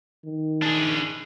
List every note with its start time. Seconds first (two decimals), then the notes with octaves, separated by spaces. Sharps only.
0.24 D#3
0.62 D4 G#4